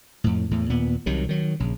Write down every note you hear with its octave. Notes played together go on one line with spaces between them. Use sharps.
F2 A2
E2 A2
D#2 A#2 B3
C2 C3 D#3 F#3
D#3 F#3
A#1 C#3